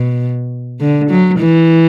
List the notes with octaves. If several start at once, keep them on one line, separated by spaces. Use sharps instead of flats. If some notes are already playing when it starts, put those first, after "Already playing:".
Already playing: B2
D3
F#3
E3